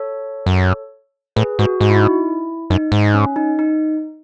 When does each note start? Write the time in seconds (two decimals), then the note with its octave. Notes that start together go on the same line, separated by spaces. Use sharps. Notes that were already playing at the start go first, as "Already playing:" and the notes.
Already playing: A4 C#5
0.46 F#2
1.36 A2 G#4 B4
1.59 G#2 F#4
1.80 G#2 F#4
1.90 E4
1.98 D#4
2.06 E4
2.70 F#2 D#4
2.92 G#2
3.14 C#4
3.36 D#4
3.59 D#4